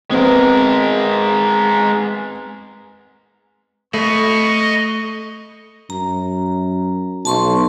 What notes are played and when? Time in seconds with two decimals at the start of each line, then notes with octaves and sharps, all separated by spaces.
0.11 G#3 B3 C4 A#4
3.94 A3 D#5 B5 C#6
5.90 F#2 A#5
7.25 B1 A5 C6 C#6